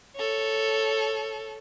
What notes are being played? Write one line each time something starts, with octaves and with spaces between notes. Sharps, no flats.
A4 C#5